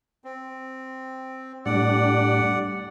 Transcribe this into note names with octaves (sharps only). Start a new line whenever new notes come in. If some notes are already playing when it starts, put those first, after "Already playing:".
C4
A2 G3 D4 D5 F#5